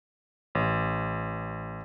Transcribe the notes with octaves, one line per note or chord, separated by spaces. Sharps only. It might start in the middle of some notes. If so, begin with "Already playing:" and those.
A1